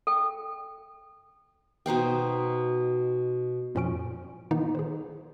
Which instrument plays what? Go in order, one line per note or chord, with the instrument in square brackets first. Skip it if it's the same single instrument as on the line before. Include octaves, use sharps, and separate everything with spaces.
[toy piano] A4 G5
[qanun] B2 D#4 C5 G5
[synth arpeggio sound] F2 A#2 F3 C#4 C#6 D7
A#2 D#3 A#3 B3 D#4
G#4 B4 C5